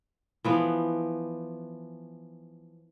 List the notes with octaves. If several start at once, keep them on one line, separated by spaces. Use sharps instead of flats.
E3 F3 B3